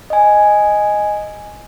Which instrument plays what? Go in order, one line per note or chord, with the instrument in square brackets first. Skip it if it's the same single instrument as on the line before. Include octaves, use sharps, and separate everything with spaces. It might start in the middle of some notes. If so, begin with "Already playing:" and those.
[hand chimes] D#5 G#5